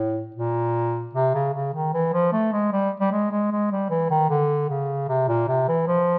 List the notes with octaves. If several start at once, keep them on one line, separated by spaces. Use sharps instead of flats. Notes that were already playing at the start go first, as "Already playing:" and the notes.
Already playing: A2
A#2
C3
C#3
C#3
D#3
E3
F3
A3
G#3
G3
G3
G#3
G#3
G#3
G3
E3
D#3
D3
C#3
C3
A#2
C3
E3
F3